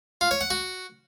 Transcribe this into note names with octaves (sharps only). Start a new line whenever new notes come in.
F4
C#5
F#5
F#4